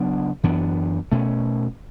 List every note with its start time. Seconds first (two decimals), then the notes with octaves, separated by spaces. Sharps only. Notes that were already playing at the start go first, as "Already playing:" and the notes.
Already playing: C#3 F#3 B3 D4
0.43 F#2 E3 B3 D4
1.12 B2 A3 C#4